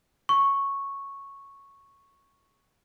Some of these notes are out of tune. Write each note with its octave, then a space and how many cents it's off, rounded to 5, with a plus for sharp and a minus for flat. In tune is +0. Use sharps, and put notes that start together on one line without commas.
C#6 -5